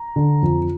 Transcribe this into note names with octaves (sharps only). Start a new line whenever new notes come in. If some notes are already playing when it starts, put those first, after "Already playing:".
Already playing: A#5
D3
F2